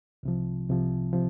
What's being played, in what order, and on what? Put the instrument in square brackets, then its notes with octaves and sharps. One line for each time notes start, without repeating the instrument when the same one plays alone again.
[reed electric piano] C2 C3 F3
C2 C3 F3
C3 F3